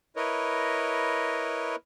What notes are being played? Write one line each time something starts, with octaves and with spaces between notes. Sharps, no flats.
E4 A#4 B4 C#5 D#5